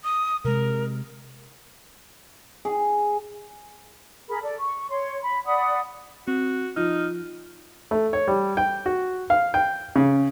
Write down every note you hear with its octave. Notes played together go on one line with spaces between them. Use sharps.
D#6
C3 G#3 A#4
G#4
G#4 A#4 B5
A4 D5
C#6
C#5 C6
B5
D5 F#5 B5 D#6
C4 F#4
F3 D#4 F6
A3
C#5
G3
G5
F#4
F5
G5
C#3